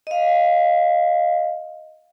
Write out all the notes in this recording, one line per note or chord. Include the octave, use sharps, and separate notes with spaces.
D#5 F5